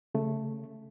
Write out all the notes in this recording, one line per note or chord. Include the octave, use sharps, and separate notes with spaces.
C#3 A3